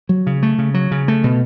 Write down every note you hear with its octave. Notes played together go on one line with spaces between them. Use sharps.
F#3
C#3
A3
C#3
F#3
C#3
A3
B2